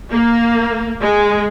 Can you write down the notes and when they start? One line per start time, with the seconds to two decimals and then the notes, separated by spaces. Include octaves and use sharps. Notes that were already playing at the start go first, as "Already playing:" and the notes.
0.12 A#3
1.02 G#3